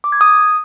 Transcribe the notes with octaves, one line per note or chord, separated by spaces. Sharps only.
D6
G#6
D#6